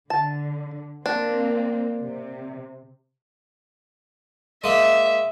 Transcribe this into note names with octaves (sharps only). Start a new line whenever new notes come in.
D3 A5
A#3 C4 D4
C3
G#3 A#3 E5